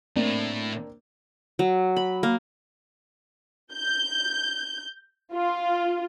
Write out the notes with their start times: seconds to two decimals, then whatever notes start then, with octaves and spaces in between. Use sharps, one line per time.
0.16 A2 A#3 C4 D4
1.59 F#3
1.97 B5
2.23 A#3
3.72 G6
5.33 F4